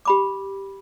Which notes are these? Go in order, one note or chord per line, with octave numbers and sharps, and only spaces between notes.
G4 B5 D6